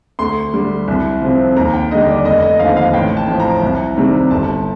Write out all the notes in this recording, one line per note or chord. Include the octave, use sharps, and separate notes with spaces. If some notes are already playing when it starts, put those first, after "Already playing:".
D2 C6
D3 G3
C2
C3 F3
D#2 A#5
G5
D3 G3 D#5
D5
F1 D#5
D#5
D#2 D3 F3 F5
F5
A1 G5
A5
A2 F3
A#5
C2
C3 D#3 G3
G1 A5